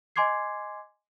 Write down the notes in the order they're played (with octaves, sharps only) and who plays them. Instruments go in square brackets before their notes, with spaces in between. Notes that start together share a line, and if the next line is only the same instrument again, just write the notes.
[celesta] D#5 G#5 C6 D6 G#6 C7